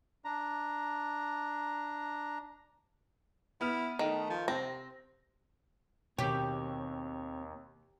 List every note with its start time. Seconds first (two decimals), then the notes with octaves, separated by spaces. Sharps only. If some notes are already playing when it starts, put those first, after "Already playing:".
0.25 D4 A#5
3.61 B3 E4 F6
3.99 D#3 A3
4.30 F3
4.48 C3 C4 A#6
6.19 D#2 B2 D#3 C4 G4 C#5